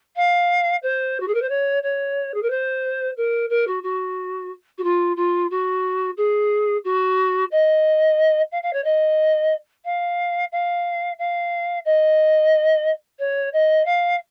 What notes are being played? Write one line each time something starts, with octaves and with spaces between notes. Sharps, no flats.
F5
C5
F#4
G#4
A#4
C5
C#5
C#5
G#4
A#4
C5
A#4
A#4
F#4
F#4
F#4
F4
F4
F#4
G#4
F#4
D#5
F5
F5
C#5
D#5
F5
F5
F5
D#5
C#5
D#5
F5